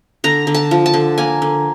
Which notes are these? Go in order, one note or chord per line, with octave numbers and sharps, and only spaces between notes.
D3 A#5
D3
A5
F3
A5
D3
A#3 G#5
D3